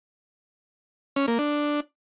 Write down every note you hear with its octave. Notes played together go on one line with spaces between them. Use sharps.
C#4
A#3
D4